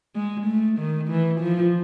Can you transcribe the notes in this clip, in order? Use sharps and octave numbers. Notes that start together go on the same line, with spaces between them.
G#3
A3
D#3
E3
F3